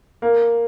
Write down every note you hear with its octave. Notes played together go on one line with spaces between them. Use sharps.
A#3